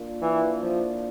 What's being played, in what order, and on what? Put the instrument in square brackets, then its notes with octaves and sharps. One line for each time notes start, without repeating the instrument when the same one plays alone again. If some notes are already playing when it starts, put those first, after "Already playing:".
Already playing: [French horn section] A#3 D4 F4
[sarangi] E3
F3